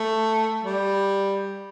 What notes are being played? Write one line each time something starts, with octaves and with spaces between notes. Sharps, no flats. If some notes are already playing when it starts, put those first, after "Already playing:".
Already playing: A3
G3